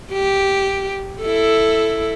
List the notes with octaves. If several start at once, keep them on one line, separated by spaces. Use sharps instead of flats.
G4
E4 A4